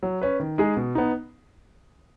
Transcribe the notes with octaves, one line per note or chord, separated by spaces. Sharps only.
F#3
C#4 B4
D#3
G#3 D#4 G#4
B2
B3 D#4